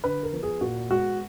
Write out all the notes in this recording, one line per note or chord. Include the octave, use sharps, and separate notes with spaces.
D3 B4
A#4
F3 B3
G#4
A#2 F#4
G#3 B3 F#4